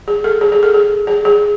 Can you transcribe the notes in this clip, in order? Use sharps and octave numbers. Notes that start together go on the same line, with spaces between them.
G#4
A4
G#4
G#4
A4
G#4
G#4
G#4